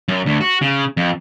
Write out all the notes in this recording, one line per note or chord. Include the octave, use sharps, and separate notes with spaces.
F#2
D2
F#4
C#3
F2